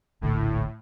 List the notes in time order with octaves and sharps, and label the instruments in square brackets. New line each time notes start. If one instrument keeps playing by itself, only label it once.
[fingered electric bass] D1 A#1 D3 [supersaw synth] A2